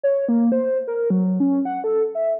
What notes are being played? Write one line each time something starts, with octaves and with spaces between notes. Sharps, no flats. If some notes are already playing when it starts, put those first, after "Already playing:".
C#5
A#3
C5
A#4
F#3
C#4
F#5
A4
E5